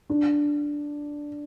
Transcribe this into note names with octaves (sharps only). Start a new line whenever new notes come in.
D4